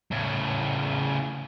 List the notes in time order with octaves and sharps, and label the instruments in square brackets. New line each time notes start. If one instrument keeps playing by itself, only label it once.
[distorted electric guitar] A2 C#3